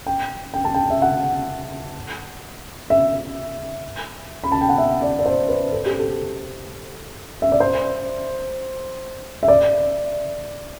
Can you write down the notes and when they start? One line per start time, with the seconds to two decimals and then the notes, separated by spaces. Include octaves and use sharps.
0.07 G5
0.54 G5
0.65 A5
0.74 G5
0.90 E5
1.02 F#5
2.90 E5
4.44 B5
4.52 A5
4.61 G5
4.69 F#5
4.78 E5
5.02 D5
5.19 D5
5.26 C5
5.48 B4
5.72 A4
5.86 G4
5.99 A4
7.42 E5
7.52 D5
7.60 C5
9.43 E5
9.48 D5